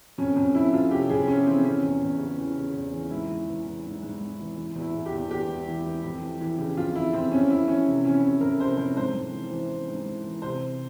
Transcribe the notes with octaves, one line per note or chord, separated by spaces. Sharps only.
F2 C#4
F2 C#4
F2 E4
F2 F4
C3 G4
F2 G#4
F2 C#4
E3 C4
E3 C#4
E2
E2
C#3
E3
C#3
E2
E3
G#2 E4
E3
E3
E3
G#2
G#2
G#2
E3
E3
E2
E4
E2
G4
E2
E2 G4
E2
E3
E3
F2
E3
E3
C#3
F2 F4
E3 E4
F2 C4
F2 C#4
F2 E4
E3 C#4
C3
E3 C#4
C3 C#4
F2 A#4
C3 C5
F2 C5
G#2 C5
G#2
E3
E3
E3
G#2
E3
E3
C3 C5
C3